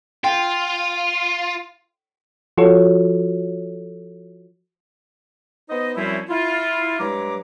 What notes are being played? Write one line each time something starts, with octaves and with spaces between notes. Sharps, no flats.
F4 G5
F3 F4 F#4 A4 C#5
B3 D#4 C5 D#5
F#2 F3 G3 C4 C#4 E4
E4 F4
G2 F#3 G#3 A#5 D6